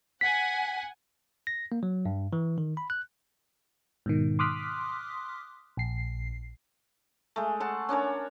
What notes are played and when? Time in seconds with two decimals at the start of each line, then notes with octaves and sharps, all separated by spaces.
0.21 F#5 G#5 B6
1.47 A#6
1.72 A#3
1.83 F#3
2.06 G2
2.33 E3
2.58 D#3
2.77 B5
2.90 F#6
4.06 G#2 B2 D#3
4.39 C6 D6 D#6 F6 F#6 B6
5.77 A#1 C7
7.36 G#3 A3
7.60 F#5 A5 C6
7.89 C#4 D4 A#4 C#5